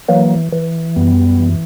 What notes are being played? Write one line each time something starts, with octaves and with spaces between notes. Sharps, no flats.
E3 F#3 A#3
E3
F#2 G3 B3
E3